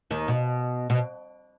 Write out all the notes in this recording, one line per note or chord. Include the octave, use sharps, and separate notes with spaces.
D#2 D#3
B2
B2